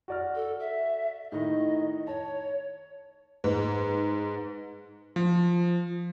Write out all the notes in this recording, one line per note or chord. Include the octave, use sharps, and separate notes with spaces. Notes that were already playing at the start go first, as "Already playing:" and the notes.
F#4 D5 F6
A4
E5
A2 D#3 D#4 D#5
C#5 A5
G#2 B4
F3